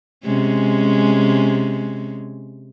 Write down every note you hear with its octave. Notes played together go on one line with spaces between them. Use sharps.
C3 G#3 C#4